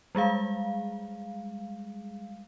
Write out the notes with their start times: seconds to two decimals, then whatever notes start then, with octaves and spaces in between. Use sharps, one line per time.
0.15 G3 G#3 G#4 F5